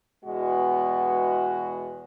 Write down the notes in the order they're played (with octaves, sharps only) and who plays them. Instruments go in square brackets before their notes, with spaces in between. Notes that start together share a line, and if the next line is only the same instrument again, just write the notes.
[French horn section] E2 B2 G#3 B3 F#4